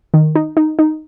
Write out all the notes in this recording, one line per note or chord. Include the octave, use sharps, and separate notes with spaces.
D#3
D#4
D#4
D#4